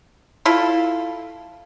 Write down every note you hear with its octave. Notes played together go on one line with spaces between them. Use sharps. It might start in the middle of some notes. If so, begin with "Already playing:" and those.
E4 F4 A4